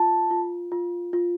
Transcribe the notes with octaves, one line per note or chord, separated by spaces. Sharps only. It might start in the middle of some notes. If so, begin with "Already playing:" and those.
Already playing: F4 A5
F4
F4
F4